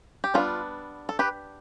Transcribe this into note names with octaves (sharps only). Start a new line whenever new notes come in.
G4
G3 B3 D4 F4 A4
A4
G4 B4